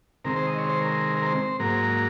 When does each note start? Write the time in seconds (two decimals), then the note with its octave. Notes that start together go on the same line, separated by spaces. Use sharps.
0.25 C3 D#3 G#3 C4 A#4
0.36 C5
0.47 D#5
0.59 C#5
0.69 C5
0.81 A#4
1.17 A#4
1.26 C5
1.60 G#2 F#3 A#3 A#4